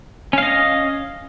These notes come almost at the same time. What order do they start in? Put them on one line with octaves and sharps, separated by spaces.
C#4 F5 D#5